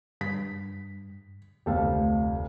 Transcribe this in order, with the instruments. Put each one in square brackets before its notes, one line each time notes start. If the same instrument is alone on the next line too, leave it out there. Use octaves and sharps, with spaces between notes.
[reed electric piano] G2 [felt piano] B6
[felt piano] F1 D2 [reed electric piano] G4 A4 F5